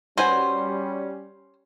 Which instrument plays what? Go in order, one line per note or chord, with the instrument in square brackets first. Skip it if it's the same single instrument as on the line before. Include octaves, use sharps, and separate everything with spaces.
[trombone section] G3 C#4 [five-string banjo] F#4 B4 G#5 [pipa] C5